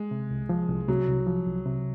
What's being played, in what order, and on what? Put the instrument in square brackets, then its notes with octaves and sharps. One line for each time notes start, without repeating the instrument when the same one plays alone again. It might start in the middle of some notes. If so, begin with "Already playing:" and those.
Already playing: [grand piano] G#3
[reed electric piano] C3
C2
F3
C2
[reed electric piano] C3 [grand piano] F#3
[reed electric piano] C2
F3
C2
C3